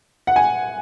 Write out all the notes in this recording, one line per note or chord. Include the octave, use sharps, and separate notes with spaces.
F#5
G#5